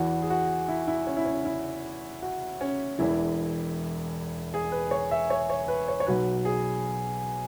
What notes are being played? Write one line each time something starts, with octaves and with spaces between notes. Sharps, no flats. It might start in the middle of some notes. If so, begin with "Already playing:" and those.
Already playing: E2 E3 F#4
G#4
F#4
E4
E4
C#4
E4
C#4
E4
F#4
C#4
E1 E2 E3 E4
G#4
B4
C#5
E5
C#5
C#5
B4
C#5
C#5
B1 B2 F#3 B4
G#4